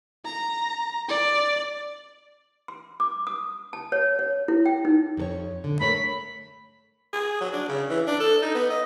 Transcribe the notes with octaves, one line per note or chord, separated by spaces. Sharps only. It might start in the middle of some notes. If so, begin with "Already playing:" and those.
A#5
D5
C6
D6
D#6
A5
C#5
C#5
E4
G5
D#4
F2 A4 C#5
D3
A3 A#4 C#5 B5
G#4
F#3
D4
C#3
E3
D4
A4
D#4
B3
D#5